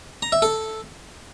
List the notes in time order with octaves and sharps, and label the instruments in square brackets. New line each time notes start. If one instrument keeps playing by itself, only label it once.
[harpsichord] A#5
E5
A4